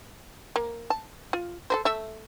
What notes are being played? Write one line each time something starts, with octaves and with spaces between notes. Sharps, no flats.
A#3
A5
F4
A4 A#4 C5
A3 E5